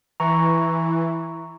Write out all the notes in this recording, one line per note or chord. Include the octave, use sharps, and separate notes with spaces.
E3 A#5 C#6